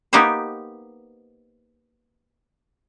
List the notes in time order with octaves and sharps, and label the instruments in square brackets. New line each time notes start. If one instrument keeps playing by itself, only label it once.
[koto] A#3 B3 D#4 G4 B4 C5